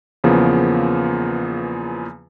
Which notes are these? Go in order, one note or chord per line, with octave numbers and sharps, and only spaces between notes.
E2 C#3 F3 A#3 B3